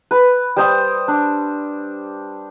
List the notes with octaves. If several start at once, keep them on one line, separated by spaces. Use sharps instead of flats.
B4
G3 C5 D#6
D4